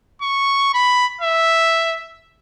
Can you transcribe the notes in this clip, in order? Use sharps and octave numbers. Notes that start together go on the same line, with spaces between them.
C#6
B5
E5